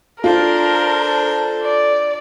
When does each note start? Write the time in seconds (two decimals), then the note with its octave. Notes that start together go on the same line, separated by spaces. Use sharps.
0.24 D4 F4 A4 A#4 C5
1.64 D5